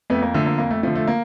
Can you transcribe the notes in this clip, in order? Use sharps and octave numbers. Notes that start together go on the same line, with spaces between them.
F2 A3 B3
A#3
D3 F3 A3
A#3
F2 A#3
A3
D3 F3 A3
A3
A#3